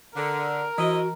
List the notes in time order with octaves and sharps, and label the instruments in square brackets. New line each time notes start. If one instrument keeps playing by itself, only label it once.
[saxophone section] D3 [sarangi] A#4
[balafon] E3 [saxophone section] E4 C5 D#5 [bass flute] F#4